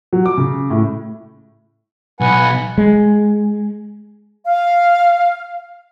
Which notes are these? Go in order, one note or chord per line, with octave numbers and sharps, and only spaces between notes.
F#3
D6
C#3
A2
B1 B4 F#5 G#5
G#3
F5